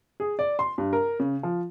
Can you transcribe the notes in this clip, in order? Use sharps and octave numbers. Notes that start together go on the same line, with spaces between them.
G#4
D5
C6
G2
A#4
C#3
F3